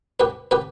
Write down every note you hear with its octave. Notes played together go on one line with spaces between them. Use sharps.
G4 B4
G4 B4